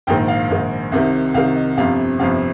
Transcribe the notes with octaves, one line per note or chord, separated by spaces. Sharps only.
A#1 G#2 D#3 G5
F5
A#1 G#2 D#3
C2 C3 D#3
C2 C3 D#3 F5
D#5
G1 F2 C3 F5
G1 F2 C3 F5